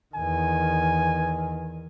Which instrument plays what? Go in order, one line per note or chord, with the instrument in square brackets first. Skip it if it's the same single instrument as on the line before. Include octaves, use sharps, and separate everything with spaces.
[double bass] E2 D#3 [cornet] G#5